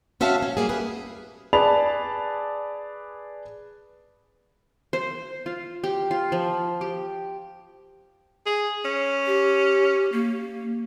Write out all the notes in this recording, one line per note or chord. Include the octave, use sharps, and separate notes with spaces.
C4 C#4 F#4 E5 F5 A5
B2 C#4
G3 A#3 G#4
G4 G#4 B4
G#4 B4 D5 A5 B5 F7
C5
F4
G4
F4
F3
G4
G#4
C#4
G4
A#3